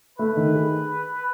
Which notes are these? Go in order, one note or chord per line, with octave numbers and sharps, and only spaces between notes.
A3 B4
D#3
G#4